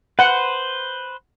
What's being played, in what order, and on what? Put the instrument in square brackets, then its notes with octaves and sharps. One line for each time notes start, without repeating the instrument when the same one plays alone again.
[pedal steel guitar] B4 C5 [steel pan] F#5